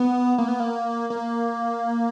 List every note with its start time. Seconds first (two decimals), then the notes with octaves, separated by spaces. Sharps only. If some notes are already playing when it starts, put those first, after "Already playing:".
Already playing: B3
0.38 A#3
0.48 B3
0.60 A#3
1.10 A#3